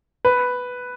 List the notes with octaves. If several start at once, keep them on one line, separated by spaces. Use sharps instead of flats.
B4